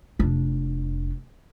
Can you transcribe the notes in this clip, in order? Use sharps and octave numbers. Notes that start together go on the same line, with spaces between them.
F1 D4